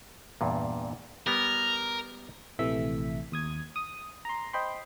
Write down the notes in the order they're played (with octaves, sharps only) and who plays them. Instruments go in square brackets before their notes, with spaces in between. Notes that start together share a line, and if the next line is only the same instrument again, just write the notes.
[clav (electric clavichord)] E2 G2 A#2
[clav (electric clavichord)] G3 B3 [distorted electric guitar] A#4
[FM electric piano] A#1 C3 E3 A3 E5 B6
D#2 D#6 G#6
D#6
A#5 C6
C5 D#5 G5 B5 C6